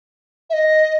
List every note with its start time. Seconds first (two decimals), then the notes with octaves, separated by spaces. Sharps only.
0.50 E5
0.53 D#5